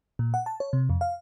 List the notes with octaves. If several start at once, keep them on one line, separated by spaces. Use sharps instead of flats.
A#2
F#5
A5
C#5
C3
F2
F5